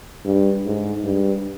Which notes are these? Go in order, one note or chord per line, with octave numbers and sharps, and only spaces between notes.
G2
G#2
G2